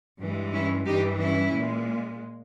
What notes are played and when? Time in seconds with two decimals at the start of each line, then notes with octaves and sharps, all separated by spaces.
0.19 G2 E3 G#3
0.53 C#4 E4
0.86 G2 E3 G3 D#4 G4
1.20 C#4 E4
1.53 A#2 G#3